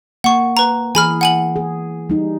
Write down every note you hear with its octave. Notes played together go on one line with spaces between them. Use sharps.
A#3 F#5 C#6
B4 A#5
E3 G#4 G#5 B5 F6
F#5 G#5 F#7
G#4
G3 D#4